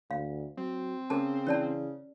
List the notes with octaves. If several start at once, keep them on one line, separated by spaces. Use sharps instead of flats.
D2 F5
F#3 C4
C#3 C#4 G#4 A#4 A5
E3 C#4 D5 A5